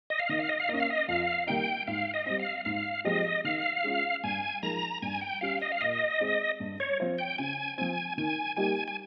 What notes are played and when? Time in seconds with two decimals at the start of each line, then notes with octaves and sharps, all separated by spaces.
0.10 D#5
0.19 F5
0.29 D#3 D#5
0.39 F5
0.49 D#5
0.60 F5
0.69 A#3 C#4 D#5
0.80 F5
0.90 D#5
1.08 F2 F5
1.47 D#3 G3 A#3 D#4 G5
1.87 G#2 F5
2.14 D#5
2.26 G3 C4
2.39 F5
2.65 G#2 F5
3.05 F3 G#3 C4 G4 D#5
3.44 D#3 F5
3.84 G#3 C#4 F4
4.24 G2 G#5
4.62 F3 G#3 D#4 A#4 A#5
5.02 G2 G#5
5.21 G5
5.41 G3 C#4 G4 F5
5.62 D#5
5.72 F5
5.81 A#2 D#5
6.20 G#3 C4
6.60 G2
6.80 C#5
7.00 F3 C4 F4 C5
7.18 G5
7.38 C#3 G#5
7.78 F3 C4 G#5
8.18 D#3 G#5
8.56 G3 A#3 D#4 G4 G#5
8.88 G#5